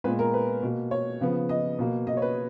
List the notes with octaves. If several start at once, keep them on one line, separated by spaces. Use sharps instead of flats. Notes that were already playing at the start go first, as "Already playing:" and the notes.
A#2 G#3 B3 B4
A#4
B4
B2 A#3
C#5
C#3 F3 B3
D#5
B2 A#3
D#5
C#5
B4